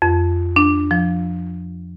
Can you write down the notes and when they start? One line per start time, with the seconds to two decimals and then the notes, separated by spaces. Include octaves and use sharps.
0.02 F2
0.56 D4
0.91 F3